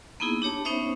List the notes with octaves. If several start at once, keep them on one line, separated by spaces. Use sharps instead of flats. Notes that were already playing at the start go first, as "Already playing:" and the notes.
A#3 B3 D#4 E4 G#4
D4 G4 C#5 A5
B3 C#4 D#4 C5 C#5 E5